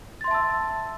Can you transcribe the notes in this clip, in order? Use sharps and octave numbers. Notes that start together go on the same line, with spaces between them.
E5 A5 C6 E6 A6